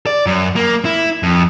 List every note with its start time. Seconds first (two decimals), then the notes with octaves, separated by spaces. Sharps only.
0.07 D5
0.26 F#2
0.56 A#3
0.85 E4
1.23 F2